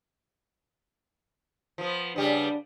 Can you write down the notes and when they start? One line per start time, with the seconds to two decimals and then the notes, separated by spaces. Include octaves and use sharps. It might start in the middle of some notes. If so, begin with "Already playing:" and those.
1.78 F3 B3
2.16 C#3 G3 B3 D4